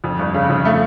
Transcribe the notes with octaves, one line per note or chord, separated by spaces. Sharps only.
F2
G1
C#3
F2
A3